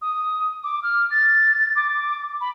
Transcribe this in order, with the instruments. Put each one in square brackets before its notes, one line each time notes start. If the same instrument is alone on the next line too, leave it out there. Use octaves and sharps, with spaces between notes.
[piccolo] D#6
D6
F6
A6
D6
B5